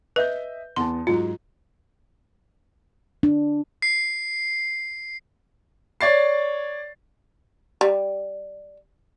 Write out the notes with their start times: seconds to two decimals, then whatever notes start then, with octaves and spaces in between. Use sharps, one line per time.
0.16 B4 D#5 E5 G6
0.76 E2 B3 A5 C6
1.07 G#2 F#3 F4
3.23 D4
3.82 C7
6.01 C#5 D5 A6 C7
7.81 G3